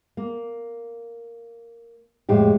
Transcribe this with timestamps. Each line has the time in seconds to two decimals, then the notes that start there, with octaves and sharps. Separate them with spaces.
0.17 A#3
2.29 F2 A2 G#3 G4